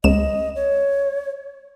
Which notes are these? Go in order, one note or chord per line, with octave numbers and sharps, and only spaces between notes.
C#2 D#5 E7
C#5